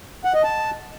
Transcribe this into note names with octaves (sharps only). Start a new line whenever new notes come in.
F#5
D#5
A5